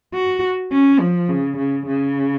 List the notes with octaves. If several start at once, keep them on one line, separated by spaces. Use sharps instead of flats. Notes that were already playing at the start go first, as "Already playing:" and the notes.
F#4
C#4
F3
C#3
C#3
C#3